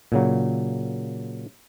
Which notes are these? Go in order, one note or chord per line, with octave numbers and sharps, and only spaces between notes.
A#2 C#3 F#3